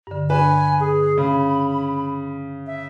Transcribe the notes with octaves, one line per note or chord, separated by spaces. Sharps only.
G2 D3
D4 B4 G#5
G#4
C#3 B5
E5